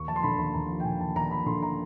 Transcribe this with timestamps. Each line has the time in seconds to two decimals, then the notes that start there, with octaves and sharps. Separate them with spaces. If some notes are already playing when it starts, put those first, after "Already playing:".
Already playing: D#2 C#6
0.08 F3 A5
0.16 C6
0.23 D3 B5
0.38 D#2 C6
0.54 D#2 A#5
0.70 F3
0.80 G5
0.85 D3 G#5
1.01 D#2 A5
1.16 D#2 A#5
1.31 F3 B5
1.46 D3 C6
1.63 A#5